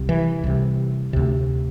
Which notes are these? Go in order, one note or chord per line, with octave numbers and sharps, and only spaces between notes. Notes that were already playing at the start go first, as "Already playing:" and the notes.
Already playing: C2 C3
E3
C2 C3
D2 C3